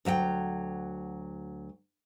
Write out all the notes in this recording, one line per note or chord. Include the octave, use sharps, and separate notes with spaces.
D2 F#3 E5 G5